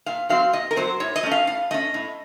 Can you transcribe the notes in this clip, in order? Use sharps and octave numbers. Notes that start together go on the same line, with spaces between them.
A#2 F5
F#3 C4 F5
A#2 D#5
A#4
F#3 C4 C5
A2 C#5
D#5
A3 C#4
F5
A2 F5
A3 C#4 D#5
A2